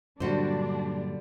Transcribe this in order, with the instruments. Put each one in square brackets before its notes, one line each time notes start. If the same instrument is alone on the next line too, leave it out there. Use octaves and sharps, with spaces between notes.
[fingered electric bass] G2 A#2 F#3 [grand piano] D3 G3 [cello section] D4 [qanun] F#4 C5